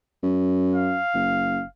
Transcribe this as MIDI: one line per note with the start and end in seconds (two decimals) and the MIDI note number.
0.23 0.98 42
0.75 1.67 77
1.14 1.61 30